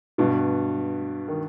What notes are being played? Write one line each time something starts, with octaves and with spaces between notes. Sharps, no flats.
G2 B2
D#3